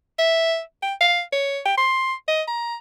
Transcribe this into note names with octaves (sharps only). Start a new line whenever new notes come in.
E5
G5
F5
C#5
G5
C6
D#5
A#5